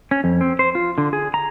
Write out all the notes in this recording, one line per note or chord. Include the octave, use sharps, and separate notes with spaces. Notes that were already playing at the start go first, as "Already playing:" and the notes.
C#4
F2
C4
C5
F4
D3
G#4
A#5